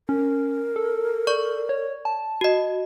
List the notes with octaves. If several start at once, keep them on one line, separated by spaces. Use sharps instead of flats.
C#4 A#4
A4
D5 C#6
C#5
A5
F#4 D#5